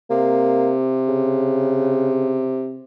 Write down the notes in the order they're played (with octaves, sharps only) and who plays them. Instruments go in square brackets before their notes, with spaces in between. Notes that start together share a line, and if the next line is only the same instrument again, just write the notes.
[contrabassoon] C3 [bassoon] A#3
[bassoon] C#3